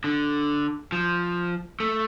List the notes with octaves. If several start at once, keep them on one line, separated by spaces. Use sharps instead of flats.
D3
F3
A3